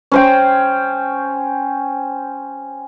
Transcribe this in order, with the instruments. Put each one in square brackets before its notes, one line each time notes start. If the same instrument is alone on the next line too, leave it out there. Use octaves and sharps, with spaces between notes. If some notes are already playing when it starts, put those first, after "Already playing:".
[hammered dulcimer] C#4 C5 G5